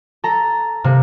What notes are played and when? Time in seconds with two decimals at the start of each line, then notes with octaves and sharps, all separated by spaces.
0.24 A4 A#5
0.84 C3 A#3